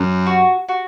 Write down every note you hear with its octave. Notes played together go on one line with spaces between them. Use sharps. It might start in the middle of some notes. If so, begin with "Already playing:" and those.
Already playing: F#2
F#4
F#4